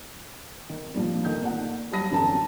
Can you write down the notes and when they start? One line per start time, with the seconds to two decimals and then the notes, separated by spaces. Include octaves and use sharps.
0.70 D#3
0.94 G2 A#2 F3
1.25 D#3 A3 G6
1.42 A#2 F#5
1.92 F#3 G3 A5 B5 A#6 D#7
2.11 F#2 D3 E3 B3 A5 A#5